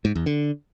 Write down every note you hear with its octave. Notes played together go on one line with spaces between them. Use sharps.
G#2
E2
D3